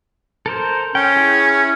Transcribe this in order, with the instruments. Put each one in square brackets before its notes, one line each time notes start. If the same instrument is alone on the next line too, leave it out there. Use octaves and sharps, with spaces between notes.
[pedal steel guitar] A4 A#4 C5
[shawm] C#4 [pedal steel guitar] G5
[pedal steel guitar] E4 G#4